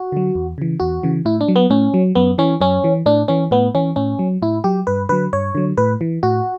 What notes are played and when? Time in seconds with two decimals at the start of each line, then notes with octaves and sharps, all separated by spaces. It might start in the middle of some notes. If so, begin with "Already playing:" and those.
Already playing: F#4
0.12 D3 F#3
0.35 E2
0.58 C#3 E3
0.80 E2 F#4
1.03 C#3 E3
1.25 A2 E4
1.41 D4
1.48 F#3
1.56 B3
1.70 A2 C#4
1.94 F#3
2.15 F#2 B3
2.38 E3 C#4
2.61 F#2 C#4
2.84 E3
3.06 A2 D4
3.28 E3 C#4
3.51 A2 B3
3.75 E3 C#4
3.96 A2 C#4
4.19 F#3
4.42 A2 E4
4.64 F#3 G4
4.87 G2 B4
5.09 D3 F#3 B4
5.33 G2 C#5
5.55 D3 F#3
5.78 A2 B4
6.01 E3
6.23 A2 F#4